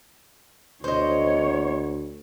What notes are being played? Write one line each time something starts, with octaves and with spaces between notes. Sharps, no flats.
D2 C5 C#5 D#5